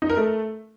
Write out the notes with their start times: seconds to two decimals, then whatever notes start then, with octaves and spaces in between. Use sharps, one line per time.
0.02 D#4
0.10 A#4
0.17 A3